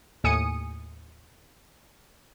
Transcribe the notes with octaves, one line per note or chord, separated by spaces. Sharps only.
D#2 A2 G#5 D#6 C#7 D#7